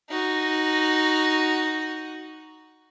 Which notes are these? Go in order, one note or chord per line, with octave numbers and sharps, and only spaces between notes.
D#4 F#4